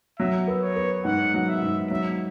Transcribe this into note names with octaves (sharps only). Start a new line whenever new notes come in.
F#3 E5
B3
C#5
B3
G#2 F#5
F#3
E5
G#2
F#3 E5